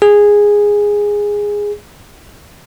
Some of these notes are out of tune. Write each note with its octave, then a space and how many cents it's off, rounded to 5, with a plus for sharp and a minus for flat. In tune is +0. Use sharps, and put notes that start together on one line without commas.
G#4 -10